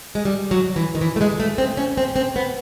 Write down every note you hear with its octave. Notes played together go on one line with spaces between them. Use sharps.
G#3
G3
F#3
E3
D#3
E3
A3
G#3
A3
C4
C#4
C4
C4
B3